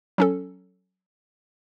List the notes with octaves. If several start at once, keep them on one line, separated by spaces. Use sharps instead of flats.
F#3 C#4 A4